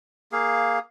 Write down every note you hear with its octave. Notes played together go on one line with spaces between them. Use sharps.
A#3 G#4 F5